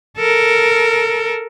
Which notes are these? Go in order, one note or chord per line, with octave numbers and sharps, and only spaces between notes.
A4 A#4